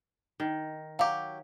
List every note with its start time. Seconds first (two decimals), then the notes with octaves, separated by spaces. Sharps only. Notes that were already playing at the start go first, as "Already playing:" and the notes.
0.40 D#3
0.99 F#3 G4 F5